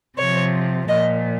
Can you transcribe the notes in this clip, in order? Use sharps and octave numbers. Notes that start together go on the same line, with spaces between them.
C3 F3 C#5
A#2 F3 D#5